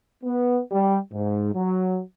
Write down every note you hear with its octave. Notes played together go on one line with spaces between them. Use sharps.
B3
G3
G#2
F#3